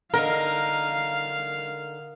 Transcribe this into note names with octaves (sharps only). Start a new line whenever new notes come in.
D3 D#4 A#4 F5